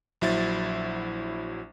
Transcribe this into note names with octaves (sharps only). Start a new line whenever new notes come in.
A#1 F#3 E4 C5 A6